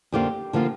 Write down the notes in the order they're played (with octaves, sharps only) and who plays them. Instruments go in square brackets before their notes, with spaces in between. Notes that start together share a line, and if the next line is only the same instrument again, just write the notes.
[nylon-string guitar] F2 D3 F3 A#3 F4 G4
D3 F3 A#3 F4